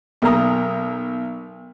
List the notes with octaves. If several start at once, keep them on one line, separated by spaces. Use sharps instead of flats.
B1 A#4 A#5 D#6